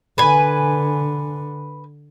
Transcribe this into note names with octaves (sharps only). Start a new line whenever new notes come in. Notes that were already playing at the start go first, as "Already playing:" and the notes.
D3 B4 G#5